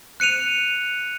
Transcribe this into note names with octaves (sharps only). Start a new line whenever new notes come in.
F#6 C#7 D#7 F7